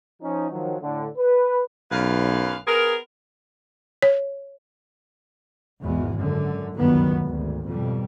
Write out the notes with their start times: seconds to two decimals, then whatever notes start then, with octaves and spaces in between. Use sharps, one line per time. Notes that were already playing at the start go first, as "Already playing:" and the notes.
0.22 F3 C#4 D#4
0.50 D#3 F3 F#3
0.80 A2 D3
1.17 B4
1.92 B1 F#2 B4 F5
2.67 B3 G#4 A#4
4.02 C#5
5.81 G#1 E2 B2 G#3
6.16 F#2 D3
6.74 G1 C#2 F#2 D#3 F#3 B3
7.19 G#1 D2
7.66 F2 B2 G3